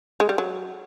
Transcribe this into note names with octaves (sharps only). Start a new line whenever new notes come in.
G#3
G3
F#3